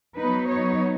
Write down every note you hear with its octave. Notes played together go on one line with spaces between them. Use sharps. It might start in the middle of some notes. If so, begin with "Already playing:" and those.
F#3 B3 D#4 B4
C#5